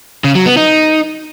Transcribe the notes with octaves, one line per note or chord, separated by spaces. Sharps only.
C#3
F#3
B3
D#4